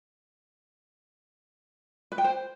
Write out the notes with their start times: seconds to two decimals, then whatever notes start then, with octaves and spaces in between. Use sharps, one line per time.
2.12 B4
2.18 G5
2.24 C5